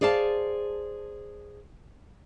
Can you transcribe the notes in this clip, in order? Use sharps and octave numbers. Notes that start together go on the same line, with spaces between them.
G#4 C5 D5 F5 A5